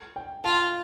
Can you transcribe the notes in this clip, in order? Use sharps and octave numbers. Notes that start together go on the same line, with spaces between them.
G5
F4 A5